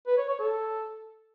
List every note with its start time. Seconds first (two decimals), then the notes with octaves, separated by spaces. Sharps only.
0.07 B4
0.18 C#5
0.29 C#5
0.40 A4